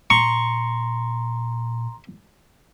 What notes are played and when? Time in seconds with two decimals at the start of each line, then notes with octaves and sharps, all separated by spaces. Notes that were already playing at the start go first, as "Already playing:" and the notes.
0.10 A#2 A#5 C6 C#6